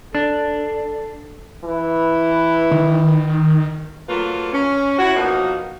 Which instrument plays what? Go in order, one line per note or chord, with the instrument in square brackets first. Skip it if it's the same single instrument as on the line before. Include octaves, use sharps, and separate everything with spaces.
[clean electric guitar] D4 [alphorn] A4
[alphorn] E3
[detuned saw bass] D#3
[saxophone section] F#3 A3 A#3 F4 A4 B4
C#4
E4 F#4 C#5
B2 F3 A#3 D#4 F#4